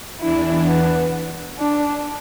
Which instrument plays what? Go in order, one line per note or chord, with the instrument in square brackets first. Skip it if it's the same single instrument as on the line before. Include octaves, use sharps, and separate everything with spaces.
[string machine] E2 E3 D4 [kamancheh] E4
[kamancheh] B3
D4